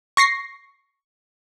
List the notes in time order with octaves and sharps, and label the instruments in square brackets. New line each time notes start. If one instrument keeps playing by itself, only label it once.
[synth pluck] C#6 A#6 C7